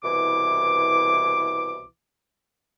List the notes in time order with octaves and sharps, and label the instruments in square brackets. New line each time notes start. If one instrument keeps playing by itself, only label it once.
[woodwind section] C2 B2 E3 D6